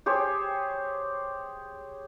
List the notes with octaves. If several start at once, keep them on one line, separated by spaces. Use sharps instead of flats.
G4 G#4 C5 C#5